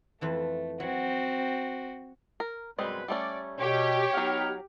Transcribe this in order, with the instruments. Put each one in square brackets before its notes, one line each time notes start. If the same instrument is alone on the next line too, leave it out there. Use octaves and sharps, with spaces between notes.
[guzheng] F2 E3 A5 [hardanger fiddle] A3
[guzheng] F#3 [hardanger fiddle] C4 F#4
[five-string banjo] A#4
[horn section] F#2 B2 B4 [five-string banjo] G3 G#3 C4
[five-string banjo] G3 A3 C#4 [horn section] D5
[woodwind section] B2 [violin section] G4 [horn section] C#5
[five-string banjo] F#3 F#5 [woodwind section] B3 D#4 F6